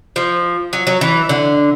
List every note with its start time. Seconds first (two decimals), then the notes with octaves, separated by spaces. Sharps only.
0.16 F3
0.73 F#3
0.87 F#3
1.01 E3
1.29 D3